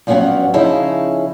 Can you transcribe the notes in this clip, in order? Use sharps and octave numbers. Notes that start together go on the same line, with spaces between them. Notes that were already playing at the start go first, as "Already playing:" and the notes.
G2 F3 F#3 B3 C#4 F#5
C#3 F3 C#4 D#4 E4 G#4